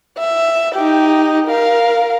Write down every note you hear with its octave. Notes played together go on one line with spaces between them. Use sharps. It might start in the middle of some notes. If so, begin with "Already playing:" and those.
E5
D#4 G4
A#4 F5